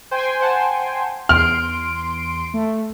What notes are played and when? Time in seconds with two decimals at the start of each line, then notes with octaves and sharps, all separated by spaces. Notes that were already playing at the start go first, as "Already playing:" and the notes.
0.11 C5 G5 G#5 C6
0.40 C5 F#5 A5
1.29 E2 C6 F6 D7
2.54 A3